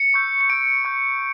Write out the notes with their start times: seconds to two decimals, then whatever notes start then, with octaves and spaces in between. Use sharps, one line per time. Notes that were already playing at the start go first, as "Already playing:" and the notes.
Already playing: C#7
0.14 C#6 E6 G6
0.41 C#7
0.50 C#6 G6 D7
0.85 C#6 G6